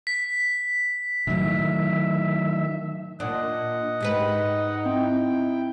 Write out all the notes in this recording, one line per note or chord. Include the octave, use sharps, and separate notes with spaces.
B6
A2 D#3 F#3 E5
A#2 D4 D#5 F#5
G#2 D#4 G4 B4
C4 E4 G5